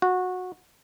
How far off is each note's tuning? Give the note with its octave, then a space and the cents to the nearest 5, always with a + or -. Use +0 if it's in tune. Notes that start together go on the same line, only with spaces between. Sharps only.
F#4 -15